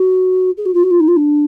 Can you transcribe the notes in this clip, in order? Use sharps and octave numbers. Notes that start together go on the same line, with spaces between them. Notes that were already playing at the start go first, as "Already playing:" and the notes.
Already playing: F#4
G#4
F#4
F4
F#4
F4
D#4
F4
D4